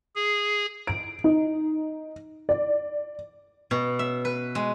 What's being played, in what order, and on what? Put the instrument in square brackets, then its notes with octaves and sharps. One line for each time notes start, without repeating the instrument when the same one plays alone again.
[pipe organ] G#4
[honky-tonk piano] D7
D#4
D5
[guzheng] B2
E5
B4
G#3